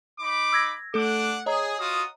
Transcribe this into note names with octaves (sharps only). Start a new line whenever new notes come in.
D#4 B5 D6
E6 G#6 A#6
A3 D4 A4 F#5 D6
G#4 C#5 D#5 A#5
F4 F#4 D#6